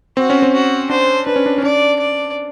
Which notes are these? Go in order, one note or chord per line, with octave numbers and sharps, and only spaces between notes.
C4 F#4
C#4
C4
F#4
D4 C5
D4 B4
C#4
D4
C#4
D4 D5
D5